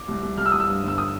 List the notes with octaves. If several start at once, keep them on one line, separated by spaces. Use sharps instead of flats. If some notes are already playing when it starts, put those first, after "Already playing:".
Already playing: D6
C2
C2
C2 F6
E6
C2 D#6
E6
G2
G1
E6
D#6